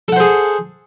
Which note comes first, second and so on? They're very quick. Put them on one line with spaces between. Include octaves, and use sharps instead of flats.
A4 F#5 C5 G#4